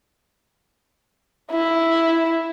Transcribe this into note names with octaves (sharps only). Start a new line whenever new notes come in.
E4